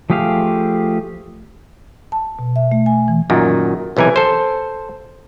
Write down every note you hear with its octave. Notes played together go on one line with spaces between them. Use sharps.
F3 A3 G4 G#4 F5
A5
B2
E5
A3
G#5
E3
F#2 A#2 D#3
B1 C3 E3 A#4 G#5
A4 C5